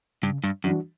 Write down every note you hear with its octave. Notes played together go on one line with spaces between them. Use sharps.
G2 C#3
G2
F#2 E3 G3 D4 F#4